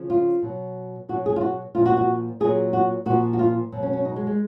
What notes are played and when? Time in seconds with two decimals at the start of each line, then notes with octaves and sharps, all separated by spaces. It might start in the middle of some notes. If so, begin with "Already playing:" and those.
Already playing: C#3 F3
0.10 F4
0.42 B2 F#3
1.09 B2 F#4
1.12 F#3
1.26 G#4
1.36 F4
1.41 F#4
1.75 A#2 F3 F4
1.86 F#4
1.97 F#4
2.40 A#2 F#3 G#4
2.73 F#4
3.06 A#2 F3 F#4
3.33 F#4
3.39 F4
3.72 B2 F#3
3.83 C#4
3.93 C#4
4.05 D#4
4.16 G#3
4.27 G#3